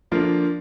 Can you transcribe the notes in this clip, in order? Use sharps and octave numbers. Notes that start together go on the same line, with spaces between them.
D3 F3 A#3 D4 F4